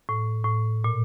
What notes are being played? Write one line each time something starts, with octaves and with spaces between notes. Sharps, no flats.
A2
A2
A#2